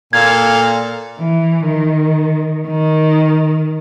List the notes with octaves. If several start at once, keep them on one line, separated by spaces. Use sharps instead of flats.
A#2 A4 F5 G#6
E3
D#3
D#3